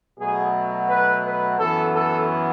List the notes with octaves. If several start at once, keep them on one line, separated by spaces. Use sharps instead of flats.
B2 F#3 A3 G#4
B4
B4
F#2 E3 B3 A4
A4